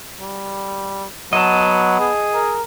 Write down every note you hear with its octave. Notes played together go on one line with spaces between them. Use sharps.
G3
F#3 B3 D#5 A5
G#4
A#4